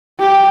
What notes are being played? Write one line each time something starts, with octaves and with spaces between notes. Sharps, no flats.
G4